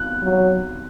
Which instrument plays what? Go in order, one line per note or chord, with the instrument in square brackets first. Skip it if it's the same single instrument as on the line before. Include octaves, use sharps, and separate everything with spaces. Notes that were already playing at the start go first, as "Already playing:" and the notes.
Already playing: [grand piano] F#6
[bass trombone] F#3